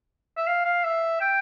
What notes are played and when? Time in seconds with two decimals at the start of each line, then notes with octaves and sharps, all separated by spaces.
0.37 E5
0.47 F5
0.65 F5
0.84 E5
1.21 G5